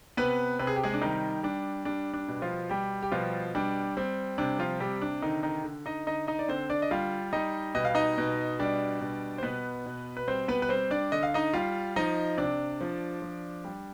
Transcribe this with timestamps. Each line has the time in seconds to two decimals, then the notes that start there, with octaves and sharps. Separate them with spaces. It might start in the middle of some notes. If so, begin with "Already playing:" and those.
0.17 C3 B3 B4
0.59 C3 B4
0.67 G#4
0.76 G4
0.84 G#3 G#4
0.94 D4
1.01 D#3 G3 D#4
1.43 G3 D4
1.85 G3 D4
2.14 D4
2.28 B2
2.42 F3 F4
2.70 G3 G4
3.03 G4
3.12 B2 F3 F4
3.55 G3 D4
3.97 G3 C4
4.38 C3 D4
4.59 F3 F4
4.80 C3 G3 G4
5.02 D4
5.22 D3 D#3 D#4
5.43 D#3 D#4
5.64 D3
5.86 D#4 D#5
6.07 D3 D#4 D#5
6.27 D#4 D#5
6.39 D5
6.48 D3 C4 C5
6.70 D4 D5
6.82 D#5
6.91 G3 F4 F5
7.33 G3 D#4 D#5
7.75 B2 D#5
7.85 F5
7.95 D#4 D#5
8.18 B2
8.59 G3 D4 D5
9.01 B2
9.38 C5
9.43 B2 B3 B4
9.86 B2
10.17 B4
10.28 G3 C4 C5
10.48 B3 B4
10.62 B4
10.69 G3 C4 C5
10.91 D4 D5
11.12 D3 D#5
11.23 F5
11.34 D#4 D#5
11.53 G3 F4 F5
11.96 F3 D#4 D#5
12.37 C3 D4 D5
12.81 F3
13.22 F3
13.64 G3